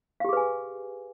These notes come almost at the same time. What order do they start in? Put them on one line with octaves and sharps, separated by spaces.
F5 G4 G#4 B4 G#5